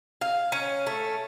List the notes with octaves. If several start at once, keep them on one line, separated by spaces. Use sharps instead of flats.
F5
C#4
A3